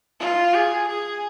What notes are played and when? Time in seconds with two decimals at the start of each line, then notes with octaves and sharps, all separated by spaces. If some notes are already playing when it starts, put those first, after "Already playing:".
0.20 F4
0.54 G#4
0.88 G#4